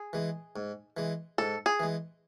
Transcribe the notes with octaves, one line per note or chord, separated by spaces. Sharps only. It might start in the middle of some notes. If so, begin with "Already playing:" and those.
Already playing: G#4
E3 G#3
G#2
E3 G#3
G#2 A4
G#4
E3 G#3